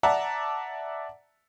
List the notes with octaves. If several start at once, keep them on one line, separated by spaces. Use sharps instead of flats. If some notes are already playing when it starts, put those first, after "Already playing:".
D5 E5 F#5 A5 A#5